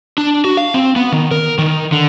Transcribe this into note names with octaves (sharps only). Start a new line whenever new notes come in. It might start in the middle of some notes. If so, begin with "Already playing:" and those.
D4
F#4
F5
C4
B3
D#3
A#4
D#3
D3